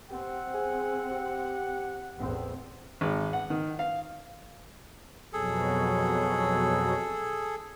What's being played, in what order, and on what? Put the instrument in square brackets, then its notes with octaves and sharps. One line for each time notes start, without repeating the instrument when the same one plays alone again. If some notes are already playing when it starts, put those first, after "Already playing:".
[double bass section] C4 [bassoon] G4 [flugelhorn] F#5
[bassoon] G#4
G4
[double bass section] A1 E2 C4
[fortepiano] G#1
F#5
D#3
F5
[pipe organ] F2 B2 F#3 [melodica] G#4 A4